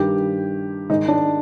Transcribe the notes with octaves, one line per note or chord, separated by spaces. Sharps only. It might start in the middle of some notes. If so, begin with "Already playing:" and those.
Already playing: G2 D#3 G3 G4
G#2 D#3 G#3 D#4
D4